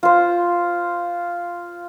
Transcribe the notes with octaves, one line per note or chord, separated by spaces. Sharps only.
F4 C5